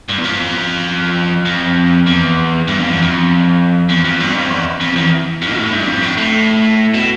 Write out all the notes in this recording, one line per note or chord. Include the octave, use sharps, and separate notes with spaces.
G2
E2
F2
F2
E2
G2
F2
E2
F2
E2
F2
G2
F2
E2
F2
E2
F2
B2
A2
G2
F2
A2
A2
B2